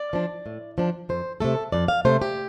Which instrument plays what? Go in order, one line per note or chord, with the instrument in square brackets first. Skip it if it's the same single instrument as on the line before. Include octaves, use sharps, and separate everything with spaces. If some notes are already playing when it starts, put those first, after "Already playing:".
Already playing: [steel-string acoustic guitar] D5
F3 D4
A2
F3 D4
F2 C5
C3 A3 A4
F2 D5
F5
C3 A3 C5
G4